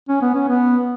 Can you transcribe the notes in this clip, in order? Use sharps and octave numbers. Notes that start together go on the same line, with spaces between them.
C#4
B3
C#4
B3